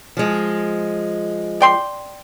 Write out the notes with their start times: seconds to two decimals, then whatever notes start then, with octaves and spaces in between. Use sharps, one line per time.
0.17 F3 G#3
1.61 D5 G5 C6